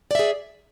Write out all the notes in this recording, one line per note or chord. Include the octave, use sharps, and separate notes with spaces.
G#4 D5 E5